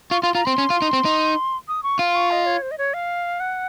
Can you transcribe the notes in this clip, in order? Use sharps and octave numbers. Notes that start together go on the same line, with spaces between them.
F4 C#6
F4 C6
F4 A#5
C4 C6
C#4
F4
D#4
C4
D#4
D#6
C#6
F4 C6
C#6
D#5
C#5
C5
D#5
C#5
F5
F#5